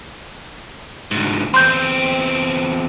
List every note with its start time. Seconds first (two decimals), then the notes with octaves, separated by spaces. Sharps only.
1.11 D2 G#2
1.54 E2 C4 C6 G6